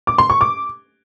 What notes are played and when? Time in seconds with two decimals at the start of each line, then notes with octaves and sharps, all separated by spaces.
0.07 D6
0.18 C6
0.30 C#6
0.41 D6